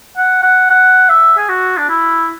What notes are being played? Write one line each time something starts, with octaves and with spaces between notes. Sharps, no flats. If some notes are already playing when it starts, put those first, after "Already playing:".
F#5
F#5
F#5
E5
G#4
F#4
D4
E4